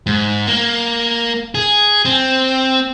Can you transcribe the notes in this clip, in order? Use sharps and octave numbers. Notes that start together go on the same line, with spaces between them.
G#2
A#3
G#4
C4